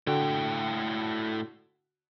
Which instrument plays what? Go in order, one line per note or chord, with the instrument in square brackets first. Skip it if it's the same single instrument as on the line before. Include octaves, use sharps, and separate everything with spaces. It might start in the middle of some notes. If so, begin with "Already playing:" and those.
[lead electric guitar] A2 G5 [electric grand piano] D3 F#4